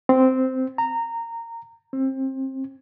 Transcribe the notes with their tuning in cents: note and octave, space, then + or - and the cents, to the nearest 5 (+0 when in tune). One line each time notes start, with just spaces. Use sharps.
C4 -10
A#5 -15
C4 +25